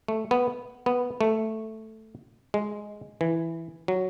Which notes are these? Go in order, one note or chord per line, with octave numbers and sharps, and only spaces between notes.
A3
B3
B3
A3
G#3
E3
F#3